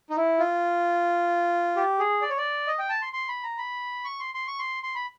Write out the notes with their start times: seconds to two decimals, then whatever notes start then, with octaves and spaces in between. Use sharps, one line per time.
0.10 D#4
0.17 E4
0.39 F4
1.76 G4
2.00 G#4
2.22 D5
2.30 C#5
2.38 D5
2.67 D#5
2.79 G5
2.90 A5
3.02 C6
3.13 C6
3.28 B5
3.44 A#5
3.58 B5
4.05 C#6
4.20 C6
4.34 C6
4.48 C#6
4.59 C6
4.83 C6
4.95 B5